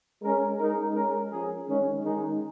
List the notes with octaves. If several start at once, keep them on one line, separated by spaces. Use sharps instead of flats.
G#3 C#4 A#4
G#3 D#4 A#4
G#3 C#4 A#4
F3 C#4 G#4
D#3 G#3 C#4
D#3 G#3 D#4 G#4